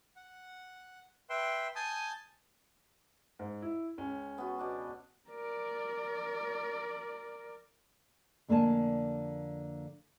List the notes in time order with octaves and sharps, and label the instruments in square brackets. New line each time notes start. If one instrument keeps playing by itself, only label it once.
[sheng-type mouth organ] F#5
B4 E5 G5 C6
G#5 A5 D#6 G6
[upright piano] G#2
E4
C#2 C#4
[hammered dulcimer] B3 F#4
B2 D4 B4
[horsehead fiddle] A#4 D5
[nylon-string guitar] F2 D3 A#3 D5 G#5 A5